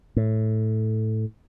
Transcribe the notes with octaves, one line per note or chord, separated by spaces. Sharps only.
A2